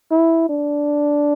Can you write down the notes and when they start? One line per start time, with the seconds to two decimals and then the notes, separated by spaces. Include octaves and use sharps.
0.11 E4
0.49 D4